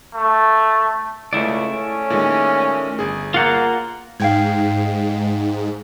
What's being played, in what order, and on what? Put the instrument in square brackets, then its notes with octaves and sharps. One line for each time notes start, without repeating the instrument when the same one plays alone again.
[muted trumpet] A3
[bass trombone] C#2 [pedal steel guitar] A3 E4 D5
[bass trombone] C#4
[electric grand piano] A#2 D#3 G#3
G1 G#4
[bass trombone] A#3 [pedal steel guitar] F4 F#5 A#5
[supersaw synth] G#2 [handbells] F5 G5 G#6